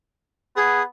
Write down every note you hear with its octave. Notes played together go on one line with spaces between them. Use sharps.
B3 G#4